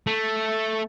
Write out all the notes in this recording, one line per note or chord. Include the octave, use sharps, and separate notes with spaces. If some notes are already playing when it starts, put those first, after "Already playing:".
A3